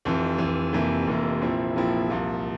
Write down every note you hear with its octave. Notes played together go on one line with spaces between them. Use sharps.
F1 F2 E3
F1 F2 E3
F1 F2 C3 E3 A#3
F1 F2 C3 E3 A#3
A#1 A#2 F3 C4 E4
A#1 A#2 F3 C4 E4
C2 A#2 F3